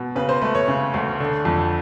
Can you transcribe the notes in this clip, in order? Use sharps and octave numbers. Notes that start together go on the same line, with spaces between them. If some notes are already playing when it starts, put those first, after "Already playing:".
Already playing: B2
C#3 B4
C5
A3 B4
C#5
C#3
D2
D3
F2